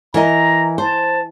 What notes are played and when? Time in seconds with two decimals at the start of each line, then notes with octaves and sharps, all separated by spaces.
0.14 E3 A#4 D#5 A#5
0.78 C5 A5